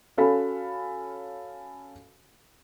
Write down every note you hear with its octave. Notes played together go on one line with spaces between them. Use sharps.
C#4 F#4 A4 F5 B5